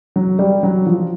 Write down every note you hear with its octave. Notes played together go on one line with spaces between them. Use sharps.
F#3
G3
F#3
F3